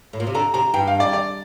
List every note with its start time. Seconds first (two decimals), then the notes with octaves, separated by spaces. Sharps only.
0.13 A2
0.20 A#2
0.27 C3
0.35 D3 A#5
0.54 C3 A#5
0.74 G2 G5
0.87 F5
1.00 D5
1.13 D5